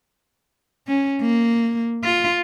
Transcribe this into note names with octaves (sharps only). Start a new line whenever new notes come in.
C#4
A#3
F4